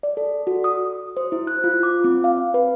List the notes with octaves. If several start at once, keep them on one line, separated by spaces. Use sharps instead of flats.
D5
A4
F#4
D#6
C5
E4
F#6
F4
D6
C4
F5
B4